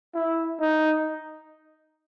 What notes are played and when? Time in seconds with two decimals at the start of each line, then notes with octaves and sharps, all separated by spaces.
0.14 E4
0.60 D#4